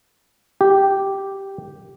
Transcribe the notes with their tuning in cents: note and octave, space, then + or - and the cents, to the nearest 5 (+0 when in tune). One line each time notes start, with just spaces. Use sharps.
G4 -5